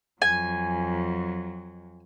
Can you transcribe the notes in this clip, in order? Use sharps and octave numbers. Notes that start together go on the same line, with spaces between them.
F2 F#3 G#5